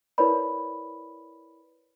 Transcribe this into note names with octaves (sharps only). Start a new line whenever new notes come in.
E4 A#4 B4 C#5 D5 B5